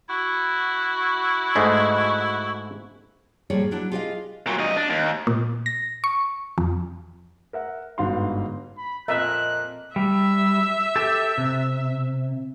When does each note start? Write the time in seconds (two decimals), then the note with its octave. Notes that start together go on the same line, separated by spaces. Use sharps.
0.10 E4 F#4
1.56 G#2 G#3 A3
3.50 A2 F3 G3 A#3 G#4 C#5
3.71 F#3 D4 E4
3.92 F4 G4 G#4 C5 D#5 F5
4.47 A#2 F#3
4.59 G2 D#5
4.77 D4
4.90 D#2
5.27 A#2
5.66 A#6
6.04 C#6
6.58 F2
7.53 A#4 E5 F#5
7.98 G1 G#2 B3 F#4 F5 C6
8.77 B5
9.08 F2 A#2 A#3 D#5 E5 A#5 F#6
9.96 G3 E5
10.96 G4 A4
11.38 C3